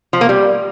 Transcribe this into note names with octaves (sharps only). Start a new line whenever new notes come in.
F3
A#3
G3